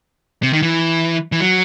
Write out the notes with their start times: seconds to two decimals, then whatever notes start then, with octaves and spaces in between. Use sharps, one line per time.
0.43 C3
0.53 D#3
0.62 E3
1.32 E3
1.40 F#3